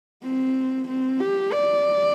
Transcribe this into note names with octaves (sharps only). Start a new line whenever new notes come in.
C4
C4
G4
D5